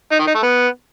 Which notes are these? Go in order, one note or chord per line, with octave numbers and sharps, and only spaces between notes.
D#4
D#3
D#4
A3
B3